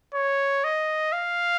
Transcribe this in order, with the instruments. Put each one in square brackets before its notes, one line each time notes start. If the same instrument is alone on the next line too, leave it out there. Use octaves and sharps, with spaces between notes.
[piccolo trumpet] C#5
D#5
F5